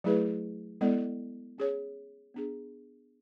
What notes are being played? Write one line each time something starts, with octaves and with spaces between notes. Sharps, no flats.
F#3 A3 E4 G#4 B4
G#3 B3 E4 A4 D5
C#4 G#4 C#5
B3 D4 G#4